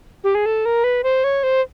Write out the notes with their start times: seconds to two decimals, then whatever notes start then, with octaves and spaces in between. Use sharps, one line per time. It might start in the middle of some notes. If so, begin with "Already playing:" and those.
0.24 G4
0.35 G#4
0.46 A4
0.65 A#4
0.84 B4
1.04 C5
1.24 C#5
1.43 C5